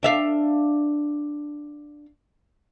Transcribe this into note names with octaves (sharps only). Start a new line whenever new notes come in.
D4 E5 F5